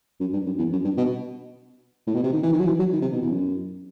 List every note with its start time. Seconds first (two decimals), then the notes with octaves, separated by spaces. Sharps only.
0.20 F#2
0.33 G2
0.46 F#2
0.58 E2
0.72 F#2
0.84 G2
0.97 B2
2.07 A2
2.15 B2
2.23 C3
2.33 D#3
2.43 E3
2.53 D#3
2.60 F#3
2.66 E3
2.79 F#3
2.92 D#3
3.02 C3
3.12 B2
3.22 E2
3.31 F#2